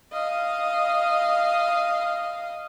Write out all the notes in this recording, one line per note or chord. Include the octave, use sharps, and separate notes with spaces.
D#5 F5